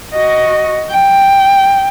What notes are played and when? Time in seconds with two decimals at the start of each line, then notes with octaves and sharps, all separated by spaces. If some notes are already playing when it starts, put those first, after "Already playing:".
0.13 F#4 D#5
0.90 G5